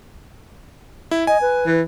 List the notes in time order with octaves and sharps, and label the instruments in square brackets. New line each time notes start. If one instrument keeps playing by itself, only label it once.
[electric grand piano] E4
[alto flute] D#5 [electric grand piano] G#5
[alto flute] B4
[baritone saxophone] E3